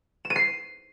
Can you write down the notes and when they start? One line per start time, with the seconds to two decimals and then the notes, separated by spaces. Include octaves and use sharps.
0.25 E7
0.30 D#7
0.36 C7